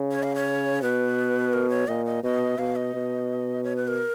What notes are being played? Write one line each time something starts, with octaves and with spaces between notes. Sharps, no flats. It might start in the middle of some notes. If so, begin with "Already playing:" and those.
Already playing: C#3
C#5
F5
C#5
B2 B4
A#4
C#5
A#2 D#5
D#5
B2 D#5
B2 F5
D#5
B2
C#5
B4
A#4